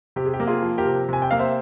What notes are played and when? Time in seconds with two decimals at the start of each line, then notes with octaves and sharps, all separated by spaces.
0.16 C3 G4
0.26 G#4
0.33 G4
0.40 A#3
0.47 F4 G#4
0.62 F3
0.78 G4 A#4
0.85 C3
1.09 C3 G#5
1.22 G5
1.31 A#3 F5
1.39 C5 E5